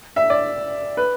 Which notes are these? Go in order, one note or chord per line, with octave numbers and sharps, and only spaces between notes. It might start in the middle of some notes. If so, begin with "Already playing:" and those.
E5
D5
B4